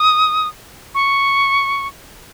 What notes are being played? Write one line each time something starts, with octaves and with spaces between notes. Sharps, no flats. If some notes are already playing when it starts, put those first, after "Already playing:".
Already playing: D#6
C#6